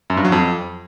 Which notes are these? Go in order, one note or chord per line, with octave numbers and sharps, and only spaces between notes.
F#2
G2
F#3
F2